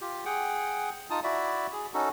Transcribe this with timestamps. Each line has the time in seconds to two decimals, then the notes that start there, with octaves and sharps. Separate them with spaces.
0.01 F4 G4
0.25 G#4 F#5 G5
1.10 D#4 F4 A5 D#6
1.24 E4 F#4 D5 E5
1.73 G#4
1.94 C#4 D#4 F#4 A4